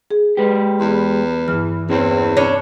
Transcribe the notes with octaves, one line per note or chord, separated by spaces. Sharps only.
G#4
G#3 G4 B4
E2 C6
G2 E3 E4 F6
E2 C4 C#4 C5
C#4 D4 C#5